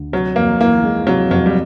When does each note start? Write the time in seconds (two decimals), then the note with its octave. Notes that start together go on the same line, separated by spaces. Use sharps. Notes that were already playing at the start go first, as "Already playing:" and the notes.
Already playing: D2
0.12 C3 F#3
0.36 F2 A#3
0.60 E3 A#3
0.84 G#3
1.07 C3 F#3
1.31 F2 F#3
1.46 G3